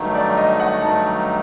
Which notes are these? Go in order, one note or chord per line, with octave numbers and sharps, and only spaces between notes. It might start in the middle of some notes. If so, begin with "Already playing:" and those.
Already playing: G2 D#3 F#3 A3 D#4
D5
D#5
F#5
G2 D#3 F#3 A3 D#4 A5